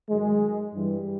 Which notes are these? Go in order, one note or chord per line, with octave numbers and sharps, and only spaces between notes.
G#2 D#3 F#3 G#3
G2 E3 G3